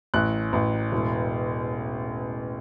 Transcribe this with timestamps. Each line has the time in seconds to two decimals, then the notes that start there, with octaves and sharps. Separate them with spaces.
0.14 A1 F#6
0.53 A1
0.92 E1